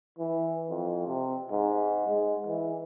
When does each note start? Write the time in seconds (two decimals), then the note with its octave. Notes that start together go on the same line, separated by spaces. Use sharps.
0.19 E3
0.70 F2
1.07 C3
1.51 G#2
2.08 G#3
2.47 E3